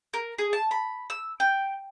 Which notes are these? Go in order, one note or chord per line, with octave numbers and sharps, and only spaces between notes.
A#4
G#4
A5
B5
E6
G5